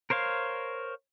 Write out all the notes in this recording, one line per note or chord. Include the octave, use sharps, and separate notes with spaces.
A#4 C5 C#5 F5